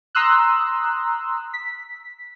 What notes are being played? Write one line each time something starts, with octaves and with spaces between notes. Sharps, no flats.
A#5 C6 D#6 E6 F#6
B6